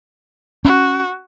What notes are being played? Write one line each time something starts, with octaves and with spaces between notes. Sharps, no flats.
C#4 F#4